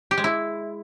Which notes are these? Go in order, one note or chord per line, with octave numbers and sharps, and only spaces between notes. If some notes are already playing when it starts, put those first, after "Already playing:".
G4
G#3
E4